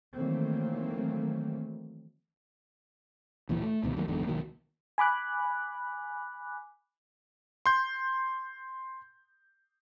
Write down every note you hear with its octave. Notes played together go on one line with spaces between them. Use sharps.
D#3 E3 F#3 A3 A#3 C4
D1 A#2 E3 F3
A3
C#2 B2 D#3
D#3 F#3 G#3 A#3
F#1 E2 G#2 D3
B1 D#3 F#3 A#3
G#5 B5 D6 F#6
C6 G6